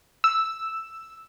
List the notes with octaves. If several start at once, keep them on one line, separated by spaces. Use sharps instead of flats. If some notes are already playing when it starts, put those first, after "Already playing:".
E6